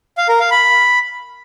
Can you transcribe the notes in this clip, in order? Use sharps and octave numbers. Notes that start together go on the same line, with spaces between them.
F5
A#4
F5
B5